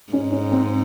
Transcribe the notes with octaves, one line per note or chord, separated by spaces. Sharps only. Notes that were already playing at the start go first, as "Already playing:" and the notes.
G#2 C#4
C#4
C4